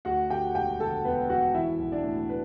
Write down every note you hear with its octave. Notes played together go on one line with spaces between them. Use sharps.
D2 F#4 F#5
D3 G4 G5
E1 G4 G5
D3 A4 A5
E1 B3 B4
E1 F#4 F#5
E3 E4 E5
B1
D4 D5
A2
B4